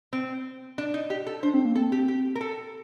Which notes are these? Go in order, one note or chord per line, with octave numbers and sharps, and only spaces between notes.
C4
D4
D#4
G4
A4
D4 C5
C4
A#3
C4 A4
G4
G4
A#4
A4